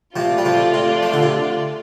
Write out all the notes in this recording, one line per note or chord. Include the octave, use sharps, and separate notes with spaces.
C3 F3 A3 F4 D5
G3
C3 F3
C3
F3
D3
C3